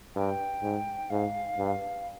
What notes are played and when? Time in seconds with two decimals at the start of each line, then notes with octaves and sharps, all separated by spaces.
0.16 G2 G5
0.63 G#2
1.10 G#2 F5
1.58 G2